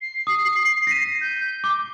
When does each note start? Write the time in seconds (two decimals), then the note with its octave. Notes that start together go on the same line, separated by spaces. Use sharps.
0.01 C7
0.27 D#6
0.87 A#6 B6 D#7
1.21 G6
1.64 D6